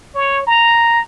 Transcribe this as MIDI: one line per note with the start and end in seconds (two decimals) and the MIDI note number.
0.15 0.43 73
0.47 1.00 82